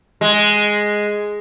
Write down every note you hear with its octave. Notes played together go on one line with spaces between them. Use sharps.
G#3